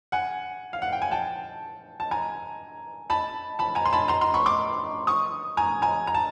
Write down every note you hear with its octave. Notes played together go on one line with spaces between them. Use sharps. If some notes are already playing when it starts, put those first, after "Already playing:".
F#5 G#5
F5
F#5
G5
G#5
G5 A5
A5
G#5 A#5
A5 B5
A5 B5
G#5 A#5
C6
A5 B5
A#5 C6
A#5 C6
B5 C#6
C6 D6
C#6 D#6
G#5 A#5
G#5 A#5
A#5
A5